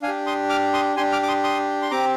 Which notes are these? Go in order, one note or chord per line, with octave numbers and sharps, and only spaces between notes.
D4 F5 G#5
G4
C6 D#6
D6 F6
C6 D#6
D4 G4 G#5 C6
D6 F6
D6
C6 D#6
C6 D#6
C6
C4 G4 A#5 D6